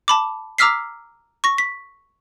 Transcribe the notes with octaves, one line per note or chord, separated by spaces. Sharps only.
A5 B5 D6
A#5 D6 E6 F6 B6 C7
C#6 A#6
B6